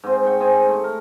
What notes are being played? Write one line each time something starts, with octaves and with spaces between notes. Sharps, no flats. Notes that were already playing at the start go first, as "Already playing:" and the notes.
G#2 C4
G#2 F#5 G5 C#6
C4 G#4 E5
A3 C#6
A#4